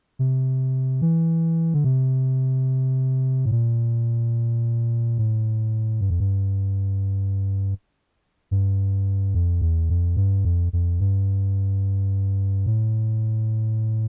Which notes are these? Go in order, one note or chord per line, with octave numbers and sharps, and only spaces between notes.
C3
E3
D3
C3
A2
A#2
A2
G2
F2
G2
G2
F2
E2
F2
G2
F2
F2
G2
A2